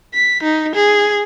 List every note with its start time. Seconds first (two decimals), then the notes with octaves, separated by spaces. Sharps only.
0.14 B6
0.43 D#4
0.75 G#4